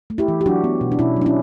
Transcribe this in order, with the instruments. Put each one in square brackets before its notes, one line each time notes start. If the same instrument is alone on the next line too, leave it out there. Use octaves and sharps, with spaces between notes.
[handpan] A3
E4 G4
E3
G4
F#3 D4 F#4
B3
B2
D4
B2 C#4 E4
F#3
D4
C#4 E4